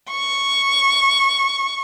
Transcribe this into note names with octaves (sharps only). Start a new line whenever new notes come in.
C#6